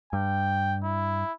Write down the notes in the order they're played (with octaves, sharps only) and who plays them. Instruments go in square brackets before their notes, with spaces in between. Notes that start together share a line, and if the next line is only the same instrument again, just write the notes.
[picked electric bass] G2 [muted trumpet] G5
[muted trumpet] E4